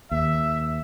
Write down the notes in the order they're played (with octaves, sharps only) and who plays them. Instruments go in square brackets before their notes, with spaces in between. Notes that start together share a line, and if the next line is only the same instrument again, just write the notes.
[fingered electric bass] D#2 [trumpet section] E5